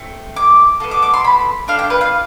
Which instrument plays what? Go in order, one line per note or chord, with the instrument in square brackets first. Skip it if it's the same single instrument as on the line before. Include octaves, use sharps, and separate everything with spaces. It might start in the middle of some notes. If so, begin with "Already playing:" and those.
Already playing: [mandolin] A3 C4
D6
B3 F4 A4
D6
D6
C6
B5
D4 F4 A4 F5
G5
B4
F5